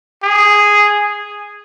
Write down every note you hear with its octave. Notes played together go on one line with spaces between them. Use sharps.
G#4